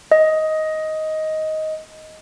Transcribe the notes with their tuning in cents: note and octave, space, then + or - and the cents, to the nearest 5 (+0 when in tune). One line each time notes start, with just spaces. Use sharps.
D#5 +10